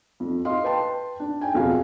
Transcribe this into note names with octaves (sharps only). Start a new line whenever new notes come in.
F2
D#5 F5 C6
B4 G5 A5 C6
D4
G5 G#5
E1 F2 B2 F#4 F5 G#5